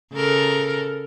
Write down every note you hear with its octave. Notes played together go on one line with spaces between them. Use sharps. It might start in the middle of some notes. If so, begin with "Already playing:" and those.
C#3 A4 A#4